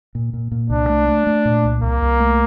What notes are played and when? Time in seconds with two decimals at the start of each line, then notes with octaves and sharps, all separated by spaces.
0.15 A#2
0.33 A#2
0.52 A#2
0.70 C2 D4
0.89 A3
1.08 A3
1.27 A3
1.45 A#2
1.64 C2
1.82 C2 A#3
2.02 C2
2.20 A3